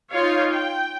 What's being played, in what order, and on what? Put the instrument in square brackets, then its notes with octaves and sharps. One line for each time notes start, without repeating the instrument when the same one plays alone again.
[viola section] D#4 F4 C#5 F5
G5